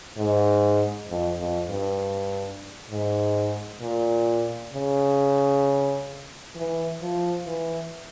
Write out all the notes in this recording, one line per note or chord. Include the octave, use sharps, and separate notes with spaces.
G#2
F2
F2
G2
G#2
A#2
C#3
E3
F3
E3